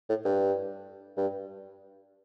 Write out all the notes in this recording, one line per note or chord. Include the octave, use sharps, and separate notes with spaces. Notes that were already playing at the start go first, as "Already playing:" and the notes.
A2
G2
G2